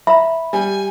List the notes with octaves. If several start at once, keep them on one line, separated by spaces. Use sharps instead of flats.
E5 A#5 B5
G3 G#5